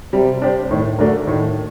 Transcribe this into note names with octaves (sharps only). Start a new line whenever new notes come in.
C3 G3
D4 G4 C5
A2 D#3
D3 A3 D4 F#4 A#4
A2 D#3